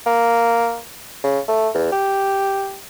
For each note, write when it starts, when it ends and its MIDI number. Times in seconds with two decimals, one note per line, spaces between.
0.06 0.78 58
1.24 1.39 49
1.48 1.69 57
1.74 1.88 40
1.92 2.77 67